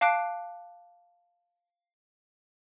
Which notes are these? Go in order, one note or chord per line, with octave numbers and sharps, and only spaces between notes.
F5 A5 D6 F#6 C7 D7